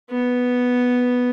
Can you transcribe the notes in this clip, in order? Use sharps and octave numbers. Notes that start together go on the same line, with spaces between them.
B3